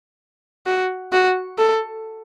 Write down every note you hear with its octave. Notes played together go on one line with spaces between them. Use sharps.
F#4
F#4
A4